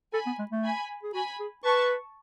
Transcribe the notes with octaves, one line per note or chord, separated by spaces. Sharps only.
A4 G#5 B5
B3
G#3
A3
G#5 B5
G#4
F#4 G#5 B5
G#4
B4 A5 C#6